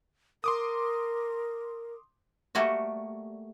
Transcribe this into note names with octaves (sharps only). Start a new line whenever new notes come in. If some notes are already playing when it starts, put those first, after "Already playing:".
A#4 C6 D6 D#6
G3 A3 A#3 F#4